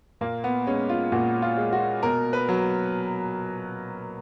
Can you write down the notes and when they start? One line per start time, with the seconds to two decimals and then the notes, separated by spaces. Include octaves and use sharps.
0.21 A#2 A#3
0.44 B3
0.67 G#3 C#4
0.89 F4
1.12 A#2 F#4
1.42 F4
1.57 G#3
1.73 F#4
2.03 B2 A#4
2.33 B4
2.49 F#3